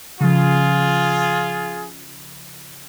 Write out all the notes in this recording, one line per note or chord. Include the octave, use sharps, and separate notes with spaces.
C#3 F3 F4 G#4